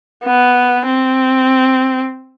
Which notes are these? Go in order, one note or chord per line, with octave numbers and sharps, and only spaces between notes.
B3
C4